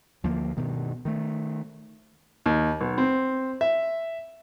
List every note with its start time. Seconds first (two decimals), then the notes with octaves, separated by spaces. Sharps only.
0.24 D2 F3 A#3
0.57 G2 B2 D#3
1.05 D#3 A3
2.46 D#2
2.81 B1
2.98 C4
3.61 E5